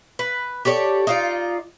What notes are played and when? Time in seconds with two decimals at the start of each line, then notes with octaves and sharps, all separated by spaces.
0.19 B4
0.65 G4 A4 C#5 D5
1.07 D#4 F4 D5